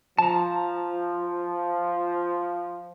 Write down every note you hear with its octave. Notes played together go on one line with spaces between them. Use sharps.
F3 A5 A#5